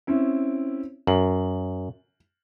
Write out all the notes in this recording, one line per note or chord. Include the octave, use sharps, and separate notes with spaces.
C4 C#4 E4
F#2 F#7